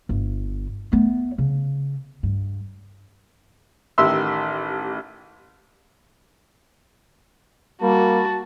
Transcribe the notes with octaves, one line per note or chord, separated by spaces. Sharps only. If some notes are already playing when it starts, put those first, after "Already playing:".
G1
A3 B3
C#3
G2
A1 D#3 G4 E5 C6 E6
G3 A#3 F#4 A5